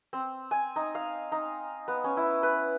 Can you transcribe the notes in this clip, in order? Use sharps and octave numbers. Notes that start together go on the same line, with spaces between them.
C4
G#5
D#4
F5
D#4
B3
C#4
E4
B4